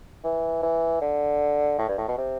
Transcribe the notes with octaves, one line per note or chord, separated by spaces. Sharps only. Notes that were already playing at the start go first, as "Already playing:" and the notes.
E3
E3
D3
A2
G2
A2
B2
C3